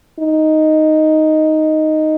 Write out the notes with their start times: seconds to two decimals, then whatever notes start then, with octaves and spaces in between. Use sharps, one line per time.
0.19 D#4